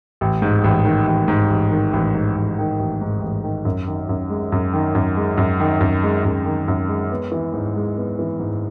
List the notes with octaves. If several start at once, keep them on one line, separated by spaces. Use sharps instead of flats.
A1
G#2
A1
D#3
A1
G#2
A1
D#3
A1
G#2
A1
D#3
A1
G#2
A1
D#3
F#2
D#3
F#2
G#3
F#2
D#3
F#2
G#3
F#2
D#3
F#2
G#3
F#2
D#3
F#2
G#3
B3
E3
G#2
G#3
B3
E3
G#2